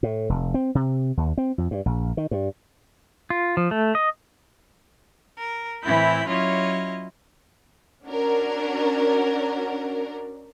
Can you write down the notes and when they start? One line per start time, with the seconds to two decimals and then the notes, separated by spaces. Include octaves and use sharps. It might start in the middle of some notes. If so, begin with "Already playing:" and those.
0.03 A2
0.29 F1
0.54 C4
0.75 C3
1.17 D#2
1.38 C4
1.58 F2
1.71 G2
1.86 A#1
2.17 D#3
2.31 G2
3.30 F4
3.57 F3
3.71 A3
3.95 D#5
5.38 A#4
5.82 A2 E3 C4 E4 B5 G6
6.28 F#3 C#4 E4 F4 C#5 D#5
8.06 C#4 D4 F#4 A#4